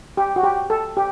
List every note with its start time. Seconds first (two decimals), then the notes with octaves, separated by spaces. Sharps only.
0.17 G4
0.36 F#4
0.44 G4
0.70 A4
0.97 G4